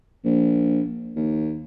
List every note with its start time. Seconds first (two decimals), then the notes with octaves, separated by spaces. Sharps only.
0.25 A#1
1.16 D#2